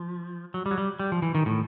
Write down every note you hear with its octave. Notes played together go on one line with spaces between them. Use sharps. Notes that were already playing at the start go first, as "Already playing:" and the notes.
Already playing: F3
F#3
G3
F#3
G3
G3
F3
E3
D#3
A2